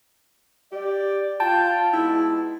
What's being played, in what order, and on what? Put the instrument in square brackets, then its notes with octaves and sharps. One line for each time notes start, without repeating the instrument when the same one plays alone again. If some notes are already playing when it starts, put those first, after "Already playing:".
[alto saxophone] G4 [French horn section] D5
[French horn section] F4 [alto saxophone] G5 [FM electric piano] A5
[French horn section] B2 G#3 D#4 [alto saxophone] E4